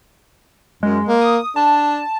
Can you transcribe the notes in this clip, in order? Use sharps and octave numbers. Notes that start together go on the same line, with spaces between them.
F#2 G#3
A#3
D#6
D4 A5